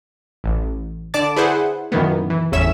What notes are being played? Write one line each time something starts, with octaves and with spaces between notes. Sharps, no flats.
A1
D3 D5 A5 D6 A6
E4 G#4 B4 C5 F#5
F#2 A#2 D#3 E3 A#3 B3
E3
G1 E2 A2 C#4 E5 E7